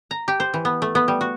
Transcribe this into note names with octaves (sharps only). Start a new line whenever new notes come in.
A#5
G4
C5
E3
B3
A3
B3
G3
F#4